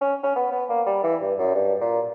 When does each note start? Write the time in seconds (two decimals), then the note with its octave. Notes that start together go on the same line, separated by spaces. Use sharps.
0.01 C#4
0.23 C#4
0.36 B3
0.52 B3
0.69 A#3
0.87 G3
1.03 E3
1.21 G2
1.39 F#2
1.55 G2
1.81 A#2